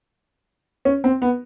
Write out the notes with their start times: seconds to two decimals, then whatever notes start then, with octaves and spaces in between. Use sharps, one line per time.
0.85 C#4
1.04 C4
1.22 B3